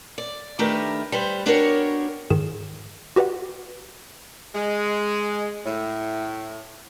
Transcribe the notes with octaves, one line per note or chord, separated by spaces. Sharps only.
D5
D#3 A3 D4 G4 A#4 B4
G3 B4 C5
B3 D4 F#4 G4 A#4 C#5
G#2 D#3 G#4 E7
F#4 G4 B4 D5 F#5
G#3
A2